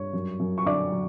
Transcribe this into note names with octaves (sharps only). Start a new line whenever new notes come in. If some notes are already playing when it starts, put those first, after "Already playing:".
Already playing: G2 C#5
F#2
F#2
C#6
D3 D5 D6
F#3